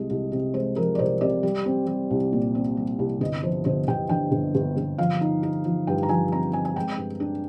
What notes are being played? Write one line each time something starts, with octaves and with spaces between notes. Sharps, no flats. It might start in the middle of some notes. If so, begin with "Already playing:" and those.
Already playing: C2 G#3 D#5
C2
C3
G#3 C5
F3 A#4
D5
C2 C5
C3 D5
G3
C4
G3
C2
A#2
C4
G3
C2
G1 D#5
F3 C5
G1 C5
G1 G5
D3 G5
G1
G1
G1
F3 F5
D#4
D#4
F3
G2 G5
A#5
F3 G#5
C4 A#5
C4 G#5
G#5
G#3 G5
G2
D4